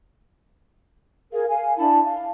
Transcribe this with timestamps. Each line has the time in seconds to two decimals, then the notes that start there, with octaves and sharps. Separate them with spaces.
1.32 G#4 A#4 F5
1.49 F5 G#5
1.77 D4 E4 A5 B5
2.05 F5